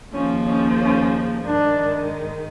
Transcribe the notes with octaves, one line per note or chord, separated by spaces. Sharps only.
D#2 C#3 F3 A#3 C#4
C#4
C#4
G#2 D#3 G#3 D4